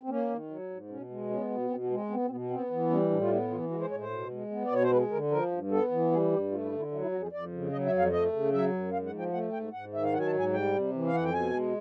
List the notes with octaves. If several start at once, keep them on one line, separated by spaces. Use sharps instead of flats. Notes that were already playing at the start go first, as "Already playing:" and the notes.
C4
A#3 C#4
D#3
F#3
G#2
B2 C#4
G#3
B3 C#4
B2
B2 C4
B3
G#3
C4
B3 C4
C4
B2 B3
B3 C4
E3
G3 C#4
A2 D4
F4
B3 E4
E3 F4
G#3 F#4
C5
A2 C#5
C5
B2
G#3
B3
D5
B2 C#5
C5
G#3 B4
D3 A#4
F3 A#4
G2
B3 A4
E3
G3 G#4
G2 G4
A3 F4
E4
D3
E4
F#3 E4
E4
F2 F#4
G#4
F2 D5
C#3
F#3 D#5
E5
F2
F5
A3 D#5
C#3
F#3 E5
F#2
G#2 F5
F#5
F3
G5
A3 F#5
G#2 G5
G#2 F#5
D#3 E5
F5
F#3 F#5
G#5
A5
G#2
G#5
G3 G5
C3
E3
F5
F2 F#5
G5
B2 G#5
G#3